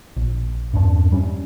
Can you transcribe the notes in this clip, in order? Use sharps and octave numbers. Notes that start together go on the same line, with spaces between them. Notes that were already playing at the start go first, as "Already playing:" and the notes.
A#1
E2 G2 A3 D4
G3 C#4